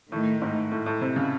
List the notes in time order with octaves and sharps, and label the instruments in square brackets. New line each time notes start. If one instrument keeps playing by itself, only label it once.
[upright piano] A2 [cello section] D#3 A3 D#4
[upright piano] G#2
A2
A2
C3
C#3